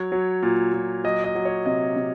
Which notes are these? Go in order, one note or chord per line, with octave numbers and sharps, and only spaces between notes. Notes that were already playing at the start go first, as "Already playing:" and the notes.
Already playing: F#3 C#5
F#3
A#2
A#2
F#3 D#5
D#5
F#3
C#5
C3 D#5
C3